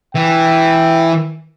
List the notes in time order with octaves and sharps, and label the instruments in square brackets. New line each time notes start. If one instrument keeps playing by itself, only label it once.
[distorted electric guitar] E3 [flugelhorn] G5